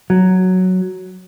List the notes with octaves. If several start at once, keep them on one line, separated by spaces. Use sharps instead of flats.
F#3